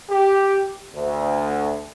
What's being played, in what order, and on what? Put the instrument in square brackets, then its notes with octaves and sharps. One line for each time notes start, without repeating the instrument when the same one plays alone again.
[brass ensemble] G4
D2